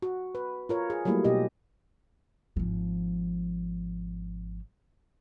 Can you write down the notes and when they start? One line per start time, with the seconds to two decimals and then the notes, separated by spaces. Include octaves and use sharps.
0.02 F#4
0.35 B4
0.69 F4 A#4 C#5
0.90 G#4
1.05 F#3 G3 A3 A#3 E4
1.24 B2 G4 D#5
2.57 G#1 F3